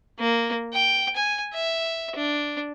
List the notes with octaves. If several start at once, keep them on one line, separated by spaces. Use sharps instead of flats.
A#3
G5
G#5
E5
D4